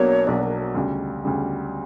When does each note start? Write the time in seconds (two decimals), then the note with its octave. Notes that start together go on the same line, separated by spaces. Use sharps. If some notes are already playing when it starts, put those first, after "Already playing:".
Already playing: B1 B2 F#3 A#3 D4 C#5
0.27 B1 B2 F#3 A#3 D4 D5
0.43 A#4
0.75 D2 C#3 G3
1.24 D2 C#3 G3